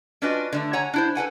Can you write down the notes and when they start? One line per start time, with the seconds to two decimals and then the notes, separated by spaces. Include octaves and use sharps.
0.22 C#4 D4 F4 F#4 B4 D#5
0.53 D3 G#3 A3
0.73 C#5 F#5 G#5 A#5
0.94 D4 E4 C5
1.15 A4 B4 F#5 G#5